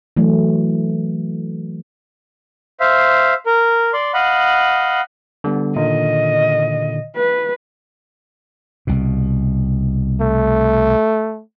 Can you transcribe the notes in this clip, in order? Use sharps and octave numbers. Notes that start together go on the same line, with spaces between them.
E3 F#3 A3
C5 E5 F5
A#4
D5 C6
D#5 F5 F#5 B5
D3 G3 B3
A#2 D3 D#3 D#5
B4
C2 B2
A3